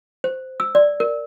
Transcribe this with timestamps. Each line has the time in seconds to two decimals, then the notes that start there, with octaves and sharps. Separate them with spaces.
0.24 C5
0.60 E6
0.75 D5
1.00 A#4